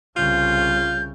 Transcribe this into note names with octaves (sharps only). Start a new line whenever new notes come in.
C2 C#3 F4 G6